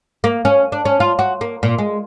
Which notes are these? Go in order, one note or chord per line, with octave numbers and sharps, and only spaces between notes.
A#3
C#4
D4
C#4
F4
F#4
A#3
A#2
G#3